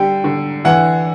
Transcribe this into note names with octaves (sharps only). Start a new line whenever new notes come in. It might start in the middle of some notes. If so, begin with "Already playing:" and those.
Already playing: D3 G3 G5
D3
E3 F#5